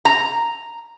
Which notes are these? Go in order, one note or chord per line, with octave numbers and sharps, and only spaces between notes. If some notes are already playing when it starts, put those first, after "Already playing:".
A#5